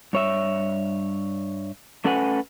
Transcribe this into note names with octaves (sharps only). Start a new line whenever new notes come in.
G2 C#5 E5
A3 C#4 A4 B4 F#5 G#5